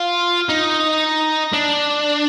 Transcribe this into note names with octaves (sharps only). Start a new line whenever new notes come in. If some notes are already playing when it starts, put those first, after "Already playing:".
Already playing: F4
D#4
D4